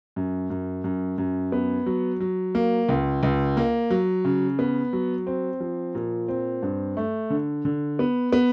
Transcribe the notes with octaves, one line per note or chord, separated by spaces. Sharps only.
F#2
F#2
F#2
F#2
B3
F#3
F#3
A#3
C#2
C#2
A#3
F#3
C#3
B3
F#3
C4
F3
A#2
C4
G2
A3
D3
D3
B3
B3